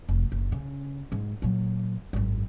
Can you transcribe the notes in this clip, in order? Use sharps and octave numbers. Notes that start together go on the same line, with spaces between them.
F1
F#1
C#3
G#2 G#3
A#2 F#3
G#1 F#2